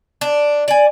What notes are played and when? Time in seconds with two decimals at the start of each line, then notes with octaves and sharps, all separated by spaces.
0.21 D4
0.68 D5 G#5